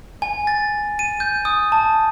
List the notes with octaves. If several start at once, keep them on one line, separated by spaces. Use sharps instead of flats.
G#5
A6
D#7
G6
D#6
A5